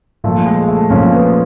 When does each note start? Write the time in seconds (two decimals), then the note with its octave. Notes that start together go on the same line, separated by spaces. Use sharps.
0.24 A#2 F3 A3
0.46 G#3
0.68 A3
0.90 A#2 F3 C#4
1.13 B3